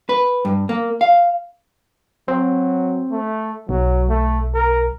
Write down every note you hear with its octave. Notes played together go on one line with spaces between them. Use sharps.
B4
G2
A#3
F5
F#3 C4
A3
B1 F#3
A3
A#4